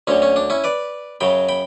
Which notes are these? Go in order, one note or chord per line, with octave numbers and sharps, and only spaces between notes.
D2 D3 F#3 C#4
C#4
D4
C#4 E4
B4 D5
F#2 C#3 F#3 G5 B5
G5 B5